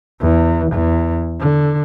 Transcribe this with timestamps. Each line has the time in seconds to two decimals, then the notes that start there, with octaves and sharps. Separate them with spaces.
0.21 E2
0.72 E2
1.39 D3